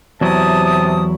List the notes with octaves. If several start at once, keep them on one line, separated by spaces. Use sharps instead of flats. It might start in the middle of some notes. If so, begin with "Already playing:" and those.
E2 C3 F#3 E4 A5 D#6